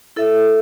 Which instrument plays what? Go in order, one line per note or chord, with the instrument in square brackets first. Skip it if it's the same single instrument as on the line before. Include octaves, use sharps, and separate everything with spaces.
[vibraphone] E4 A4 E5